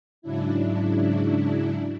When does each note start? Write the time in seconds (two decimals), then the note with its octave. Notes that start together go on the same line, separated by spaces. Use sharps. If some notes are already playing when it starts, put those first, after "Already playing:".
0.22 G#2 C#3 F#3 D4 E4